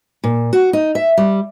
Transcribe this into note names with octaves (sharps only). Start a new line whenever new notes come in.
A#2
F#4
D#4
E5
G3